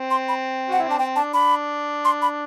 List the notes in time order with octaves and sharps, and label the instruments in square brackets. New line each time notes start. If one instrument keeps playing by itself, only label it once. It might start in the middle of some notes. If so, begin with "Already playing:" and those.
Already playing: [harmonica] C4
[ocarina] C6
B5
[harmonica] F#4 [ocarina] F#5
[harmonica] E4
[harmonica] D4 [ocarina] A5
[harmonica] C4 [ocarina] G5
[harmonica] D4 [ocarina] A5
[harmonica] D4 [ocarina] B5
[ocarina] C6
B5